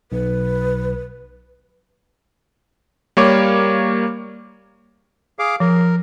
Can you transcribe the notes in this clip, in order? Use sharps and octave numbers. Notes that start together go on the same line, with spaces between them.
B1 B4
G3 A#3 C#5 D6
G#4 F5 D6
F3 A#4